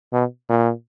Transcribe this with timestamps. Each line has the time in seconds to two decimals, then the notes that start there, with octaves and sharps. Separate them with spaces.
0.13 B2
0.49 A#2